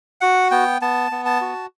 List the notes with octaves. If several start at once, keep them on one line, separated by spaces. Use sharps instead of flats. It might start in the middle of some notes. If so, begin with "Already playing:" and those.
F#4 F#5
B3 G5
B3 A5
B3
A5
F#4